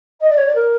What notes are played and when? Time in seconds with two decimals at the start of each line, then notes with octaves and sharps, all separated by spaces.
0.20 D#5
0.29 D5
0.37 C#5
0.46 D5
0.55 A#4